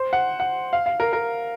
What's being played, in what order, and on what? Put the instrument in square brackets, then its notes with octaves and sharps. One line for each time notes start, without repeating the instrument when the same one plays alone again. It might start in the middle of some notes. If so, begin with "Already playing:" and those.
Already playing: [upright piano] C5
F#5
F#5
F5
F5
A#4
A#4